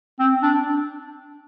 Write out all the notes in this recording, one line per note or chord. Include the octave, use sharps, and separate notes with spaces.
C4
D4